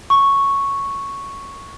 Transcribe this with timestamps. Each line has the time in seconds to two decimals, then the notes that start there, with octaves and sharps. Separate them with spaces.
0.10 C#6